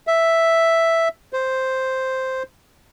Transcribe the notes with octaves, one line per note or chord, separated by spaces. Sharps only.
E5
C5